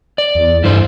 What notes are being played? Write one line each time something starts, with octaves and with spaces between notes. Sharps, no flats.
D5
E2
G2 E4 A4 C5